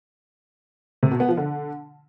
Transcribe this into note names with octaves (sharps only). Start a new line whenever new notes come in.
C3
B2
B3
F3
D3